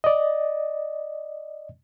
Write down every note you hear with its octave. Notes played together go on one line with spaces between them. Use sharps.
D5 D#5